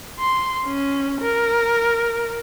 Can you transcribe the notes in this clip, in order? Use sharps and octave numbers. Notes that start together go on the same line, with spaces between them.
C6
C#4
A#4